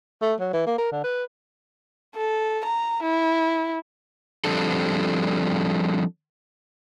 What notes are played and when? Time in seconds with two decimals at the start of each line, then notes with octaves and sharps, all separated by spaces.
0.22 A3
0.40 F#3
0.53 E3
0.67 A#3
0.78 A#4
0.92 D3
1.04 B4
2.16 A4
2.65 A#5
3.03 E4
4.45 F3 G3 C4 D4 A4